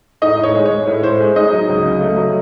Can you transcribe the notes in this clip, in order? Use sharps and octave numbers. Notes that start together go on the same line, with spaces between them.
A2 D#4 D#5
A2 C#5
G#3
C#5
G#3
A2 C#5
A2 C5
G#3
G#3 D#4 D#5
F#3
C#2
C#3
A3
F#3